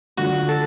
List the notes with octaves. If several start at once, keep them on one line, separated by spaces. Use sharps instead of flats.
D3 F#3 A3 D4 F4 F#4
A4